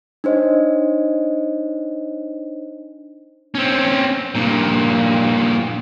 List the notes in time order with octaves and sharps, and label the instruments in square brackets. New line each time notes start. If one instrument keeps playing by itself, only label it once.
[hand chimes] D4 D#4 C5 C#5 D#5
[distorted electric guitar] C4 C#4
G2 A#2